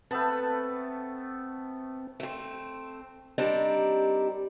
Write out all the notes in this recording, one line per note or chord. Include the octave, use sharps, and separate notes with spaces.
A3 B3 C4 B4 A5
A3 C4
G3 C4 D4 D#4 G4 A#4